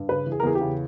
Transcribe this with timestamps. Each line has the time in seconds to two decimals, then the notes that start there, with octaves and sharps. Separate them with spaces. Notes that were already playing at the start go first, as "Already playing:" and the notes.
Already playing: G2
0.09 C#3 B4
0.26 E3
0.32 G#4
0.40 A#4
0.43 E2 G#4
0.55 G4
0.61 C#3